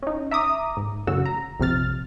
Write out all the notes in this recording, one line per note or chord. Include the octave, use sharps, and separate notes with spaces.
C#4 D#4
E5 A#5 D6 D#6
G#2
A1 F#2 A2 C#3 F#4 E6
A#5
A#1 F2 C3 F6 A6